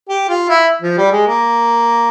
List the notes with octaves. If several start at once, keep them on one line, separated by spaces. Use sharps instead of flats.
G4
F4
E4
F3
G3
G#3
A#3